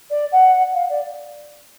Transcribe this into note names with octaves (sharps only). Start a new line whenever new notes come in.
D5
F#5
F5
D5